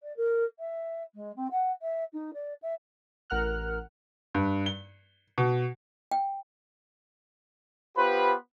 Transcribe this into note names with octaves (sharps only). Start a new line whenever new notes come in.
D5
A#4
E5
G#3
C4
F#5
E5
D#4
D5
E5
A1 A#4 F#5 F6 F#6
G2
G7
B2
G5
B3 F4 G4 B4 C5 B5